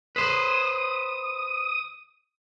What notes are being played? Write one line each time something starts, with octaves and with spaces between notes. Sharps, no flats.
B4 C5 D#6